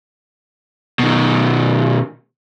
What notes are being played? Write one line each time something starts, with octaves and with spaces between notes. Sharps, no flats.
B2 D#3